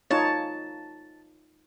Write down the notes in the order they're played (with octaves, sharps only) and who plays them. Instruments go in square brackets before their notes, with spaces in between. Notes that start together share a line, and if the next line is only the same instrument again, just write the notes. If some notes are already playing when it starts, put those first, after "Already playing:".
[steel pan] D#4 F4 C#5 [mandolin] A5